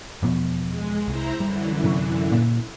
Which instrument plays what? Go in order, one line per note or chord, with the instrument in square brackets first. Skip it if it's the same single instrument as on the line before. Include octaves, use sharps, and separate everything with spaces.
[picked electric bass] E2 B2 F3
[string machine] G#3
[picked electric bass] C2 [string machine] E4 C5 A#5
[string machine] F#2 D3 E3 [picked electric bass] G3
[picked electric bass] C3 F#3
A#2